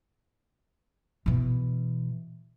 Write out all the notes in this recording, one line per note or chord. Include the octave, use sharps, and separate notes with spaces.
B2 E3